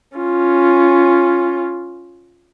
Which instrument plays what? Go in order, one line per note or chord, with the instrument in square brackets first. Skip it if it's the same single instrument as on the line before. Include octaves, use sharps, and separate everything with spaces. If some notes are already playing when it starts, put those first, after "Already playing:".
[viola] C#4 F4